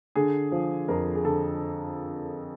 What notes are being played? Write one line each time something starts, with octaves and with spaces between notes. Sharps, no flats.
D3 G#4
F3
F2 A#4
G#4
D3 A4